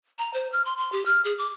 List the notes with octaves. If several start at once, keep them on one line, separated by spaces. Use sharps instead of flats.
A#5
C5
F6
C6
C6
G4
F6
G#4
D6